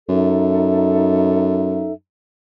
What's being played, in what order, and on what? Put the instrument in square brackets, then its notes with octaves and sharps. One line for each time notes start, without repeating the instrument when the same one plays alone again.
[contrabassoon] F#2 [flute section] D#4 A4 E5